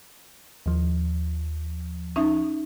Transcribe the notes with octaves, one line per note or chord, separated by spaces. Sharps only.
D#2 F3
C#4 D#4 E5